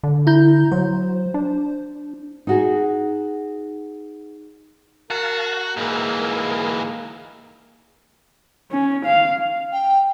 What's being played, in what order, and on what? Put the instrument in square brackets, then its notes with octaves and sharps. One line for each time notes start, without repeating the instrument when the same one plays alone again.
[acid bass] D3
[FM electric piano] E4 A#5 G6
[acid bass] F#3 [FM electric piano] C5
[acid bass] D4
[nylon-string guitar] D#4 F#4 G#4
[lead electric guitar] F#4 [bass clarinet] A#4 [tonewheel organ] F5 A5
[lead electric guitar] G#2 E3 [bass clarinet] A#3 [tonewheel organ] G#4 A#4
[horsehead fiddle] C#4
F5
[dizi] G5